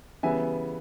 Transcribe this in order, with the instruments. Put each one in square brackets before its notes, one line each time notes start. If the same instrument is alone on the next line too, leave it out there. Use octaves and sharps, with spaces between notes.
[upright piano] C#3 E3 G3 B3 E5 G#5